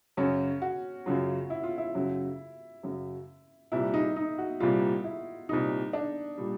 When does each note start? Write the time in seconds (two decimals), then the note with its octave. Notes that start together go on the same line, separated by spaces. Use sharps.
0.17 F#2 C#3 F#3 C#4
0.62 F#4
1.06 F#2 C#3 F#3 F4
1.50 E4
1.64 F4
1.78 E4
1.95 F#2 C#3 F#3
2.83 F#2 C#3 F#3
3.72 C2 A#2 G3 E4
3.94 D#4
4.16 D#4
4.38 F#4
4.60 C2 A#2 G3 F4
5.04 E4
5.49 C2 A#2 G3 D#4
5.93 D4
6.38 A#2 G3